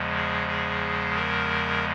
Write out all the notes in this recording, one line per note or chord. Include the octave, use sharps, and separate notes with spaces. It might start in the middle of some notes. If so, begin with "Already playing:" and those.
Already playing: E2 C#3 F3 G#3
G#4
G#4
A#4